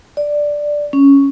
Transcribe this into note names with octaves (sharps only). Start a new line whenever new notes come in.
D5
C#4